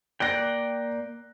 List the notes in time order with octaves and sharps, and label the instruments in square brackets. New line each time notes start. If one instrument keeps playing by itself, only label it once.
[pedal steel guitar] A#3 D5 G5 [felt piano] F#6 A#6